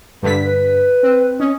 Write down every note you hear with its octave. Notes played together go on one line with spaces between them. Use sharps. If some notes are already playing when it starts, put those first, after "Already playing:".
G2 D3 B4 B6
B4
C4
C#4 D#5